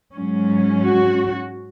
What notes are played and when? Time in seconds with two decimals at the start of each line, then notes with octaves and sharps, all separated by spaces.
0.15 G#2 F#3 C#4
0.83 F#4